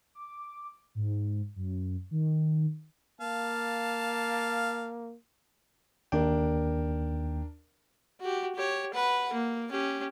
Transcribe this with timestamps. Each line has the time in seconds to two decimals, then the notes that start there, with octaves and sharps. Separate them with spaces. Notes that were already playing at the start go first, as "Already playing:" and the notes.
0.15 D6
0.95 G#2
1.56 F#2
2.11 D#3
3.21 A#3 F5 A5
6.12 D#2 D4 A#4 G5
8.21 F#4 G4
8.55 G4 C#5
8.94 B4 F#5
9.33 A#3
9.71 C#4 G4